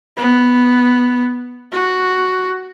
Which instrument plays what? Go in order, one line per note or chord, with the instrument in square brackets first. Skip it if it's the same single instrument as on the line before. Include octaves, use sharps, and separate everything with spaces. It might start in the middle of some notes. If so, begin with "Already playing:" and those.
[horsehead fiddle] B3
F#4